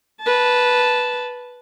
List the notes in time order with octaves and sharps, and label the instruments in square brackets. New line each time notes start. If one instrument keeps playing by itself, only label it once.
[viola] B4 A5